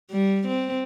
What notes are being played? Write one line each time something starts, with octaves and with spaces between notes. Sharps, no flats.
G3
C4